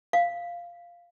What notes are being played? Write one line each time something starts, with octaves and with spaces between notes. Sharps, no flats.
F5